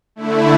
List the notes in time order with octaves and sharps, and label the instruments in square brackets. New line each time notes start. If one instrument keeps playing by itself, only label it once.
[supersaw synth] D3 A3 E4